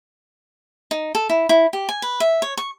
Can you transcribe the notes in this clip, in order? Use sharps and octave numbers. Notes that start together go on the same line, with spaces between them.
D#4
A4
E4
E4
G4
G#5
B4
E5
C#5
C#6